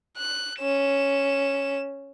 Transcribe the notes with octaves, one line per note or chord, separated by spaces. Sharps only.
F#6
C#4 E7